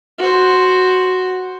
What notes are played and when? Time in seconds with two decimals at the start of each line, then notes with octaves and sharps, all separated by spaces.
0.19 F#4 C5